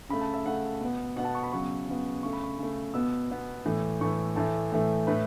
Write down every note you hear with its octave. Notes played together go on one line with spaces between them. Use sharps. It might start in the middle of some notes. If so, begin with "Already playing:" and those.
C#3 A3 B5
A5
E5
C#3 A3 F#5
B2 B3
B2 B3 F#5
A5
C#6
B5
C#3 F#3 B3 C#6
C#3 F#3 B3
C#3 A3 C#6
B5
C#6
C#3 A3
B2 B3 E6
B2 B3
A2 E3 A3
A2 E3 A3 C#6
A2 E3 A3 A5
A2 E3 A3
A2 A3 B4